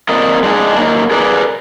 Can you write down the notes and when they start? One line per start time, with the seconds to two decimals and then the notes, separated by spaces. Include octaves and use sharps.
0.09 A#3 C4 A#4 D5 D#5
0.43 G#3 D4 D#4 G#4
0.78 F#3 A#3 D#4
1.11 G#4 A#4 B4 D5